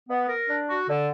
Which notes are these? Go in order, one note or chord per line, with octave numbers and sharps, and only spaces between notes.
B3
A#4
D4
F#4
D3